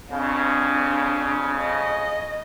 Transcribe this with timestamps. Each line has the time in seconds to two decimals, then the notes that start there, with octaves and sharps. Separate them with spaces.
0.11 F2 C#3 C4 D4
1.60 D#5